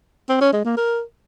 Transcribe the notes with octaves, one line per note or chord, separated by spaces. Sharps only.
C4
C#4
G#3
A#3
A#4